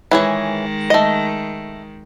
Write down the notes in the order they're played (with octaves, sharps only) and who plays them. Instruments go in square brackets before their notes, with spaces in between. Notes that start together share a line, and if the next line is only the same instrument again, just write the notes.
[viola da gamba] D#3 G#3 [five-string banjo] E3 G#4 C#5
[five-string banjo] A3 D#5